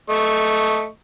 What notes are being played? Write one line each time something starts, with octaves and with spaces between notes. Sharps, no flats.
A3 D#5 C#6